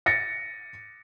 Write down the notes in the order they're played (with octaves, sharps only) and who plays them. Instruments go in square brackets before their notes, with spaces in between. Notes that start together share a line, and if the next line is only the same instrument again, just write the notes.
[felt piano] A6 A#6 C#7